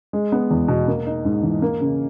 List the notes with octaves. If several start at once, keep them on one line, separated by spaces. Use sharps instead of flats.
G#3
B3
E2
B2
A#3
D#4
G#2
E3
A#3
C#3